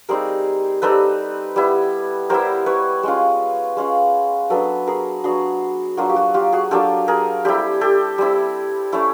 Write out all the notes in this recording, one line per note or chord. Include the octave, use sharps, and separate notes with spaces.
G3 C4 D#4 G#4 A#4
G3 C4 D#4 A4 B4
G3 B3 E4
G3 B3 E4 A#4 C5
B4 C#5
G#3 C#4 F4
G#3 C#4 F4
F#3 B3 D4 A4 B4
G#4 A#4
F#3 B3 D4 F#4 G#4
F#3 A#3 D4 F4 F#4
G4
F#4
F4 G4
F#4 G#4
F#3 A#3 D4 F4 G4 A4
G#4 A#4
G3 C4 E4 G4 A4
G4 A4
G3 C4 E4
A3 C#4 E4